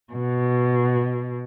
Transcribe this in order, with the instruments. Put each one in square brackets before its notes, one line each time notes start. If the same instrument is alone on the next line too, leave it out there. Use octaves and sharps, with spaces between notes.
[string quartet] B2